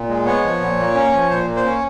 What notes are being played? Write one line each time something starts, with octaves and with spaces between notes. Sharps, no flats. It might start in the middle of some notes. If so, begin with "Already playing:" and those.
Already playing: A#2
G#3
B3 C#5
F3
A#2
A#3
C#4
F3
A#2 C5
A#3
C5
C#4 C#5